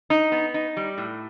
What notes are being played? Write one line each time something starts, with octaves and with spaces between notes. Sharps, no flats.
D#4
B3
D#4
G3
A2